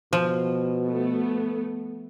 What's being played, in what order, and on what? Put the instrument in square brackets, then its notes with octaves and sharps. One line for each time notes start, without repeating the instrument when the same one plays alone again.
[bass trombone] B2 [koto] F3
[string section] A3 B3